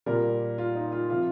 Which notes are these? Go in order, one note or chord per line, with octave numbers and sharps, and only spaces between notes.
A#2 G3 A#4
F4
D#4
F4
C3 F3 F4